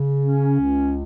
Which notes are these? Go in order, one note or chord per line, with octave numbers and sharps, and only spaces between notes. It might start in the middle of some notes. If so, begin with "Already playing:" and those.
Already playing: C#3
C#4
C#2